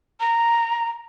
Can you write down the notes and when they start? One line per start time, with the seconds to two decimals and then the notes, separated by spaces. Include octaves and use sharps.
0.20 A#5